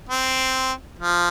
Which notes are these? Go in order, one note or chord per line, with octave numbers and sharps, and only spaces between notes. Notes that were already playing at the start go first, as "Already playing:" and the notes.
C4
F3